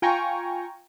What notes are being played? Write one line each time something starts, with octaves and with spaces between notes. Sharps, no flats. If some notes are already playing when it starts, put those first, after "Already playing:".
F4 G5 G#5 A#5 C#6